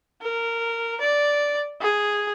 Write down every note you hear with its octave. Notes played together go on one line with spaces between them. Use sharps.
A#4
D5
G#4